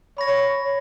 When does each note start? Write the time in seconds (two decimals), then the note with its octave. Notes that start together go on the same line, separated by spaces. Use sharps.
0.18 C#5 B5 A#6